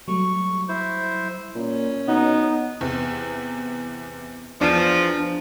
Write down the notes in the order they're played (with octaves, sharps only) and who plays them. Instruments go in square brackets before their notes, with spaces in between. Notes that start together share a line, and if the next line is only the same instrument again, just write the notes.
[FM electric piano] F#3 G3 A3 [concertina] C#6
[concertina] E4 C5
[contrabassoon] A#2 [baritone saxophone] C#4
[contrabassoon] B2 [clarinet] B3 [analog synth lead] D#4
[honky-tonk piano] E2 C3
[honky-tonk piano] E2 [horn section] F3 [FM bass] D4